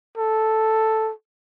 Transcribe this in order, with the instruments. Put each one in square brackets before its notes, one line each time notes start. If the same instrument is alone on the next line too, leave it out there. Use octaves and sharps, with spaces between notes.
[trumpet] A4